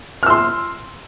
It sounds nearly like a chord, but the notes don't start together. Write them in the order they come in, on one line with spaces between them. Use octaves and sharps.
F6 E6 C6